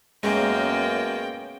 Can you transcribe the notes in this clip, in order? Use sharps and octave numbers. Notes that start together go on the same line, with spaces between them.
F#2 G#3 A#3 B3 C#4 G5